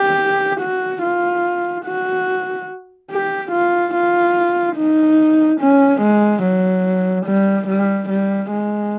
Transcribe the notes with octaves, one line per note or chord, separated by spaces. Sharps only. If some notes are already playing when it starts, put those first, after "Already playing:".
Already playing: G4
F#4
F4
F#4
G4
F4
F4
D#4
C#4
G#3
F#3
G3
G3
G3
G#3